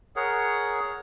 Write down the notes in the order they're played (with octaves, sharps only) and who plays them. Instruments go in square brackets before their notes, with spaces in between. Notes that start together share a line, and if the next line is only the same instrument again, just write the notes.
[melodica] G#4 A#4 C#5 F#5